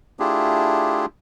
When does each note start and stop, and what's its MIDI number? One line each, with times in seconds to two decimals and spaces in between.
0.19 1.06 57
0.19 1.06 62
0.19 1.06 64
0.19 1.06 65
0.19 1.06 67
0.19 1.06 68